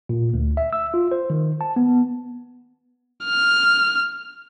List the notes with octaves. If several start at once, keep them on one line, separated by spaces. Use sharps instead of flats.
A#2
D2
E5
E6
F4
C5
D#3
A5
B3
F6